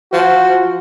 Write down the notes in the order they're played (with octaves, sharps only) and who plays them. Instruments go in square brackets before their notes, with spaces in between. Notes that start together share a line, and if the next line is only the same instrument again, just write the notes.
[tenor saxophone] F3 [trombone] F#4